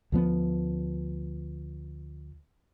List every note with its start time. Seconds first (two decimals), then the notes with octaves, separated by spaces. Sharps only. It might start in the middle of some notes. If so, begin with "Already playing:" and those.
0.12 D2 F3 B3